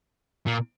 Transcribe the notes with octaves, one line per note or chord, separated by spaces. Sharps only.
A#2